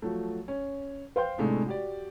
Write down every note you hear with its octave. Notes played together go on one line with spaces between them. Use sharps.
F3 F#3 A3
C#4
C5 F5 G5 C6 G6
A2 C3 G#3 A3 D4 D#4
F#4 G4 D5